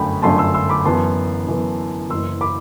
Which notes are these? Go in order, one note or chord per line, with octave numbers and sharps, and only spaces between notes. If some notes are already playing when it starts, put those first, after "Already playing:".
Already playing: G1 F#2 D3 A3 G5 B5
G1 F#2 D3 A3 A5 C6
C6 E6
C6 E6
B5 D6
F#2 E3 B3 A5 C6
F#2 E3 B3
F#1 F#2 E3 C6 E6
B5 D6